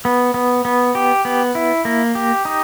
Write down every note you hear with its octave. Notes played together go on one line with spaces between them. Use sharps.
B3
B3
B3
G4
B3
E4
A#3
G4
D#4